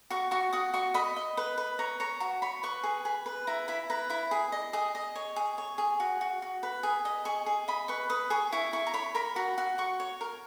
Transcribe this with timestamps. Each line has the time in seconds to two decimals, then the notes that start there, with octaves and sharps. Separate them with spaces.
0.10 F#4 C#6
0.31 F#4 C#6
0.53 F#4 D#6
0.74 F#4 C#6
0.94 D#5 B5
1.16 D#5
1.37 B4
1.58 B4
1.79 C#5 A#5
2.00 C#5 A#5
2.20 F#4 A#5
2.42 C#5 B5
2.63 B4 C#6
2.83 G#4
3.05 G#4 B5
3.26 B4
3.47 E4 A#5
3.68 E4 B5
3.90 B4 A#5
4.10 E4 B5
4.31 G#4
4.52 D#5
4.73 G#4 D#6
4.95 D#5
5.15 C#5
5.36 G#4
5.58 C#5
5.78 G#4
6.00 F#4
6.21 F#4
6.42 F#4
6.63 B4
6.83 G#4
7.05 D#5
7.25 G#4 C#6
7.46 G#4
7.68 D#5 B5
7.88 B4 C#6
8.10 B4 D#6
8.30 G#4 C#6
8.52 E4 C#6
8.73 E4 C#6
8.86 A#5
8.94 C#5 B5
9.15 A#4 B5
9.36 F#4 A#5
9.58 F#4
9.78 F#4 C#6
10.00 C#5
10.21 A#4